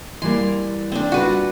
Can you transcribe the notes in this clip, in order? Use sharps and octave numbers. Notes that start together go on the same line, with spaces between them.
E3 G3 A#3 C6
C4 D4
A#2 G3 F#4 B4